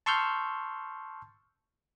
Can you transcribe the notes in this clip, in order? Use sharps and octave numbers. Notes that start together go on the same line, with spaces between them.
A5 C6 C#6 E6 F6 G6